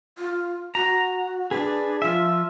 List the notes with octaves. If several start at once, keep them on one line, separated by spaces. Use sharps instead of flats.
F4
F#4 A#5
D4 G#4 B4
F3 F4 E5